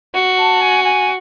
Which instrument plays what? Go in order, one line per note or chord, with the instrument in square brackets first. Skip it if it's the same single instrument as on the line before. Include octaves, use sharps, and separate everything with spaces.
[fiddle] F#4
[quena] A5
G#5
G#5